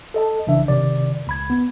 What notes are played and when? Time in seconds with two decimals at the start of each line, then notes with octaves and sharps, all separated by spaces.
0.14 A4 D#5 A5
0.47 A#1 C#3 E3 D4 E5
0.68 G#1 C3 D#3 D5
1.27 C#2 B5 G#6
1.50 B3